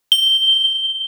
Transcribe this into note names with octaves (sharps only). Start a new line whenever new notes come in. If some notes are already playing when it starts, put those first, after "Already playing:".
G7